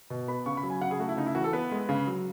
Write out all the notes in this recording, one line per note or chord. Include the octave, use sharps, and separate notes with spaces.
B2
B3 B5
C#3 C#6
B5
F#3
G#5
C#3 F#5
G#4
A3 F#4
E4
C#3 D#4
E4
E3 F#4
A4
B3 B4
G#3
C#3
F#3